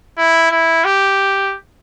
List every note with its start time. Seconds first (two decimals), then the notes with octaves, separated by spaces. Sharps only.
0.17 E4
0.51 E4
0.85 G4